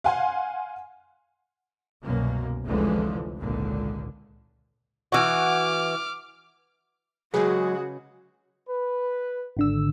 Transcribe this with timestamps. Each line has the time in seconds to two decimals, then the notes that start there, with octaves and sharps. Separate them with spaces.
0.04 F5 F#5 G#5 C6
2.04 C2 F#2 B2 A#3
2.64 F1 C#2 D3 E3 F3 G#3
3.38 G#1 C#2 A#2 D3
5.12 E3 F#4 D6 F6
7.34 C#3 F#3 G#3 F#4 G#4 B4
8.69 B4
9.57 G#1 D3 E6